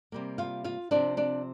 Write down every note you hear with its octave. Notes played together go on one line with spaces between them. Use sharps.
C3 G3 A#3
F4 F5
F4 F5
C3 F3 C4 D4 D5
D4 D5